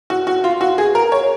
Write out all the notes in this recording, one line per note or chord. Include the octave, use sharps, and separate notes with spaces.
F#4
F#4
F4
F#4
G#4
A#4
C#5